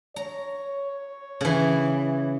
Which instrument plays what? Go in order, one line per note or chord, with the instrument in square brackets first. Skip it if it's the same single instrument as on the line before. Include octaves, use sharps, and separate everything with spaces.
[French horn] C#5 [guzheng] A#5
[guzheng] C#3 E3